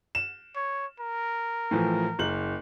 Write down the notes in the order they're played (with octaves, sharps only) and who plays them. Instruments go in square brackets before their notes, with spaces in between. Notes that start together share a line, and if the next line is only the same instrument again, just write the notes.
[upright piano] E7
[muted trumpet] C#5
A#4
[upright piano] A2 E3 F3
F#1 F#7